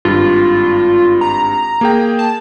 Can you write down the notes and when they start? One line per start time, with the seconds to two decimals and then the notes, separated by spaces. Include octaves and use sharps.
0.05 G#1 G2 F4
1.21 A#5
1.81 A#3 G#4 G5
2.19 A5